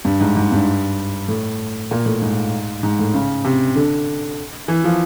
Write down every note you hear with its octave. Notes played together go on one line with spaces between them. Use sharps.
G2
G#2
G#2
G2
A2
A#2
A2
G#2
G#2
A2
C#3
C3
D3
E3
F3